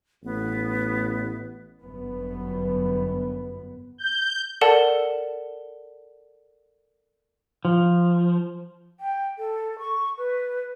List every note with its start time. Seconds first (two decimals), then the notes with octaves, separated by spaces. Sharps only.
0.24 A1 B3
1.83 G1 F#2 B3
3.98 G6
4.61 A4 A#4 D5 F#5 A5
7.65 F3
9.00 G5
9.39 A4
9.79 C#6
10.18 B4